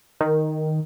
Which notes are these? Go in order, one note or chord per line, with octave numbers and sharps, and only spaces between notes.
D#3